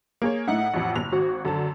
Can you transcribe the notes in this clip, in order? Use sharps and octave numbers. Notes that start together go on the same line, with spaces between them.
A#3 G#4 C#5
A2 D#4 E4 F#5
A1 F2
F#1 F7
G#1 F#4
F#2 D3 A5